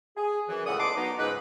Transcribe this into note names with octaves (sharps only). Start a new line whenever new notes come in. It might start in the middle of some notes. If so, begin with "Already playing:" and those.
G#4
F#2 E3
C#2 A2 D5 E5 F#5 D#6
E2 D#5 A5 C6 D6
F#3 B3 D#4
C#2 G#2 D#4 B4